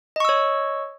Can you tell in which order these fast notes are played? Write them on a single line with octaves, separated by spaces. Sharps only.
D#5 C#6 E6 C#5